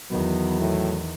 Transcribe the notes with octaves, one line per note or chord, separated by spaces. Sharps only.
E2 D#3 F#3 B3
A2